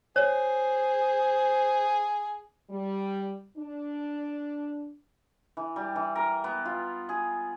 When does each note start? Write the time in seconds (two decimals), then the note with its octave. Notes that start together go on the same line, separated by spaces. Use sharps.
0.16 G#4 C5 C#5
2.70 G3
3.57 D4
5.57 E3
5.76 G3
5.96 E3
6.15 A#4
6.44 B3
6.65 F4
7.09 G#4